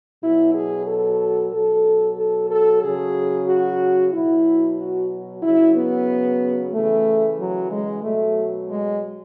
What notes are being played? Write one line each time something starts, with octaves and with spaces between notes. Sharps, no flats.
B2 F#3 E4
G#4
A4
B2 F#3 A4
A4
A4
C#3 F#3 G#4
F#4
B2 F#3 E4
F#4
C#3 F#3 E4
B3
C#3 E3 A3
F#3
G#3
B2 F#3 A3
G#3